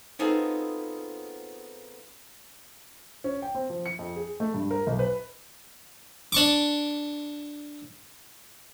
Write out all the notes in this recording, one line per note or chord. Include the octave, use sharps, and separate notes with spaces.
B3 C4 D#4 F4 G#4 A4
C#4
G5
C4
F3
C#7
F2
G#4
A3
G2
A#4
B1
B4
D4 C#6 D6